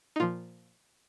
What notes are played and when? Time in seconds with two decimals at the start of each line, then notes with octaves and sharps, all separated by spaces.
0.16 D#4
0.20 A#2 F3 F4